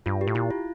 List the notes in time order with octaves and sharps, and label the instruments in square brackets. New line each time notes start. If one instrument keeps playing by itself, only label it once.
[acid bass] G2 [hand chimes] F4
[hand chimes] G4
[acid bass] A2
[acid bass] A#2 [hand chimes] E4
[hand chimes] F4